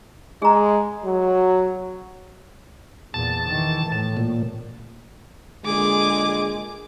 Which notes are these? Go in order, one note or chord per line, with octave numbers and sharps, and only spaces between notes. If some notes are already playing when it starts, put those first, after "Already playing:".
G#3 G#4 A#5
F#3
E2 A#2 A5
D#3 E3
A2
A#2
A#2 D3 G#3 G#4 D6